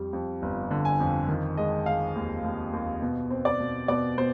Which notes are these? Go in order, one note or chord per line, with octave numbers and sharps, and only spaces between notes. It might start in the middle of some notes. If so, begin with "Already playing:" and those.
Already playing: F2 G3
F2
G1
D3
G#5
F2
D#3
G#3 D#5
G#3 F5
D#2
D#2
D#2
B2
C4
D5
B2
B2 D5
B2 C5